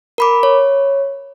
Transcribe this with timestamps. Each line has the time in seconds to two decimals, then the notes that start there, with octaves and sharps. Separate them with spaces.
0.18 A#4 B5 D6
0.43 C#5